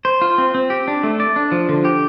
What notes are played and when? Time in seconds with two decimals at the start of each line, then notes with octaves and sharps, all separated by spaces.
0.05 C5
0.22 F4
0.38 C4
0.55 C4
0.70 G4
0.88 D4
1.03 A3
1.20 D5
1.36 D4
1.52 F3
1.69 D3
1.85 G4